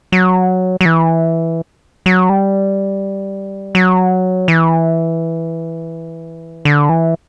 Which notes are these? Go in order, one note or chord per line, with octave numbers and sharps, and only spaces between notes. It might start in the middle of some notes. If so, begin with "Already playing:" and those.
F#3
F#3
E3
F#3
G3
F#3
E3
D3
E3